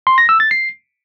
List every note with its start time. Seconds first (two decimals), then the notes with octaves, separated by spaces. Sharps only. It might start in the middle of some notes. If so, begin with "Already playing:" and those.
0.07 C6
0.18 A#6
0.29 E6
0.40 A6
0.51 C7